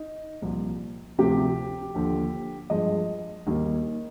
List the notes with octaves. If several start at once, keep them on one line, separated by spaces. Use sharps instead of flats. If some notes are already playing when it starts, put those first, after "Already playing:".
Already playing: D#4
C2 A#2 F3
D2 C3 F3 G4
D#2 D3 F3
G2 F3 G#3 D#5
D#2 D#3 G3 A#3